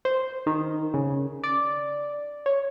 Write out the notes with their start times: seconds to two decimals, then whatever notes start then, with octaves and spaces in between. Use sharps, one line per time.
0.05 C5
0.47 D#3
0.94 C#3
1.44 D5
2.46 C#5